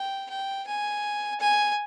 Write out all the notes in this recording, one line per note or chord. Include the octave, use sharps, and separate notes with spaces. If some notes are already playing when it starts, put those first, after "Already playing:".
Already playing: G5
G5
G#5
G#5